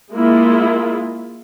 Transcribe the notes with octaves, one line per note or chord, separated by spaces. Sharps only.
G#3 A#3 E4 F4